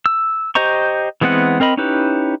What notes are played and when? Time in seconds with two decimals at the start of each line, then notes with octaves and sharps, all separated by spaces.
0.06 E6
0.55 G4 C5 D#5 A#5 C#6
1.21 E3 G#3 B3 C4 F#5
1.60 C4 A#4 D#5 B5
1.77 C#4 D#4 E4 G4 B4